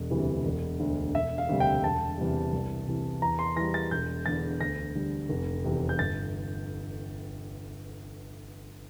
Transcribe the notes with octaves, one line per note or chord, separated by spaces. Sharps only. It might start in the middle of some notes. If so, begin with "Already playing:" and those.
Already playing: E1
D2 C3 E3 G3
E1
D2 D3
E1 E5
F5
D2 C3 G3
G5
E1 A5
E2 C3 G3
C2
C3 E3
E2 A#5
C6
E3 G3 A#6
A6
E1 G6
E2 D3 A6
D2 A#6
D3 G3
F1
E2 C3
G6
G1 A6